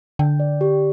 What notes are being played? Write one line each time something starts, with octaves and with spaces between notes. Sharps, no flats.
D3 G5
D5
G4